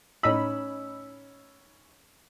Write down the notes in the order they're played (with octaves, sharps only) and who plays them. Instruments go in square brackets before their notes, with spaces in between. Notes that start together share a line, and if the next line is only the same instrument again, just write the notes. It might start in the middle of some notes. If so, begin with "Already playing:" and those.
[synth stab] A2 D#4 B5 [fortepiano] C#4 E6